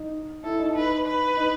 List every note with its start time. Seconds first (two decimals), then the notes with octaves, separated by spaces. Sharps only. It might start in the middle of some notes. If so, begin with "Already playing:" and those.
Already playing: D#4
0.44 E4 A4
0.59 D#4
0.76 D#4 B4
1.07 B4
1.37 D#4